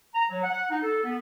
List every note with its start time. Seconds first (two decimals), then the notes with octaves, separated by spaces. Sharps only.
0.15 A#5
0.29 F#3
0.43 F#5
0.70 D#4
0.82 A4
1.04 B3